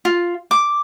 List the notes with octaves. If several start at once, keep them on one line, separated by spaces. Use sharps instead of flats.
F4
D6